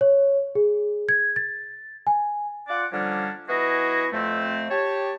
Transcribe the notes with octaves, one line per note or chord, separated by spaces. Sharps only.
C#5
G#4
G#6
A6
G#5
F4 D5 F#5
D3 F3 G3 A#3 C#4 D4
E3 B3 E4 F#4 G#4 D#5
F2 A3 C4
G4 C#5 A5